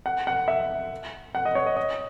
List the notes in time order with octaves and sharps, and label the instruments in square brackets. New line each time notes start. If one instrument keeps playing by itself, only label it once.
[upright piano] F#5
F#5
E5
F#5
D#5
C#5
D#5
D#5